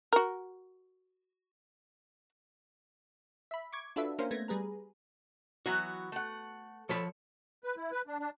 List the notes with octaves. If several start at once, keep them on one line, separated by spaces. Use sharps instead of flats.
F#4 A#4
E5 B5
C#6 D6 G#6
D4 F4 F#4 A4 B4 E5
A#3 C#4 D4 A#4 C5 F5
A3 B3 G#6 A#6
G3 G#4 B4 A#5
E3 F#3 B3 F#4
A3 F#5
F3 A4 C#5 B5
B4
E4
B4
D4
D4